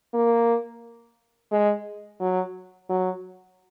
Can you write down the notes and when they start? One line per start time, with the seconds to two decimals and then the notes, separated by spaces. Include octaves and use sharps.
0.14 A#3
1.51 G#3
2.20 F#3
2.89 F#3